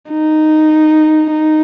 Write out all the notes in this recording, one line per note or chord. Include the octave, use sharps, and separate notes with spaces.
D#4
D#4